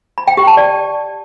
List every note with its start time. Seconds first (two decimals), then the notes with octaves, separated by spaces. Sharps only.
0.18 B5
0.28 G5
0.37 G4
0.47 A5
0.57 D5